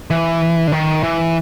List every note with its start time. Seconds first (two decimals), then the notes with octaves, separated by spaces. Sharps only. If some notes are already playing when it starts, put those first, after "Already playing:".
0.11 E3
0.67 D3
0.72 D#3
1.03 E3